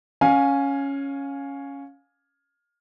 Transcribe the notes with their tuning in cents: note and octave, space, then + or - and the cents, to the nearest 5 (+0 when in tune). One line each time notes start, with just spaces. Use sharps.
C#4 +0 F5 +20 G#5 +0